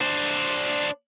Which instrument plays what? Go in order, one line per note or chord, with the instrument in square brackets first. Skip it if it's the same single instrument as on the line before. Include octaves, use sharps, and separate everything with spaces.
[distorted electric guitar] D4 C5